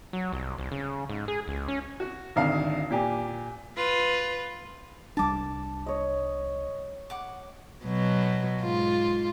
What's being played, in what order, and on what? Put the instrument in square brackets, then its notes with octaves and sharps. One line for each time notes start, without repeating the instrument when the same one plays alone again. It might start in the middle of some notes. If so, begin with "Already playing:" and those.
[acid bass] F#3
C2
C2
C#3
G#2
G#4
C#2
C#4
[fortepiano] F#4
G#1 D2 F5
A#2 G4 G#5
[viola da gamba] F4 B4
[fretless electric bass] C2 G3 D4 [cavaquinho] A5 D6
[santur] C#5 D#5
[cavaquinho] F#5 D6
[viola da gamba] B2 F#3
G#2 F4